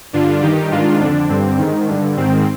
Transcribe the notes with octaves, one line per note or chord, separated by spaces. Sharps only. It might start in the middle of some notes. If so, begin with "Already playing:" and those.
G2 D3 D4 F4
G2 D#3 D#4 G4
G#2 D#3 D4 F4
F2 D3 D4
G2 D3 C4
G#2 D#3
G2 D3
G#2 D#3 C4